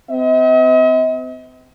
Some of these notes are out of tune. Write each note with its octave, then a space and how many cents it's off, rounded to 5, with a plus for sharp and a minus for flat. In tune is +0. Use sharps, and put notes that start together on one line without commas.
C4 -40 D#5 +45